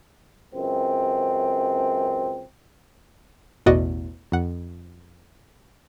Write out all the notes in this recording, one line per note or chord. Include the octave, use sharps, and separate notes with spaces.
C#2 F#2 C4
A1 E2 B2 F#4 D5 D#5
F2 F#5